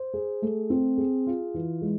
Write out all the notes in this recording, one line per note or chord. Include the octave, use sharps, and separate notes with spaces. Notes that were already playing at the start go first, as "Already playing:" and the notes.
Already playing: C5
G#4
A3
C4
G#4
F4
E3
G#3